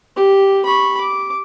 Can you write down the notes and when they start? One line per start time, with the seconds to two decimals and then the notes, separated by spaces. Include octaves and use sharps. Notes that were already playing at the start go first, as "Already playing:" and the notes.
0.16 G4
0.65 B5 C#6
1.01 D6